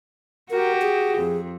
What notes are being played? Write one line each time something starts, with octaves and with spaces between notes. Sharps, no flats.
F#4 G4 A#4
G#4
F2